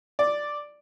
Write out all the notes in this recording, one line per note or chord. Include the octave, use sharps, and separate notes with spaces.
D5